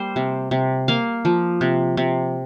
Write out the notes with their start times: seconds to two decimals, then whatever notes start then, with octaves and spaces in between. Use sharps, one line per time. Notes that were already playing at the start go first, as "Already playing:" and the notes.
Already playing: G3 A#3 C5
0.16 C3
0.51 C3
0.88 A#3 F5
1.25 F3
1.61 C3
1.97 C3